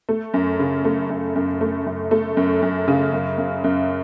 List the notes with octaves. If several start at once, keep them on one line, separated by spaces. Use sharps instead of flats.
A3
F#2
C#3
A3
F#2
F#2
A3
F#2
A3
F#2
F#2
C#3
F#2
F#2
F#2